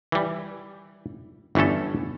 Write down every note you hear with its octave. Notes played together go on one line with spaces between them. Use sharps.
E3 G3
G1 E3 A3 C#4 A4